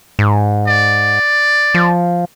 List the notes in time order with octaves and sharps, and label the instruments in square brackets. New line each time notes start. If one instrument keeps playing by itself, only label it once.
[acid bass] G#2
[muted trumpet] D5
[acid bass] F3